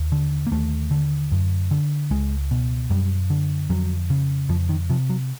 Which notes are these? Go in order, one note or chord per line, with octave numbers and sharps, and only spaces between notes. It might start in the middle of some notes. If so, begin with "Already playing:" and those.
Already playing: D#2
D3
A#3
D#2 A3
D3
F#2
D3
C#2 G#3
B2
F#2 G3
D3
F2 F#3
C#3
F2 F3
D#3
C3 F3
F#3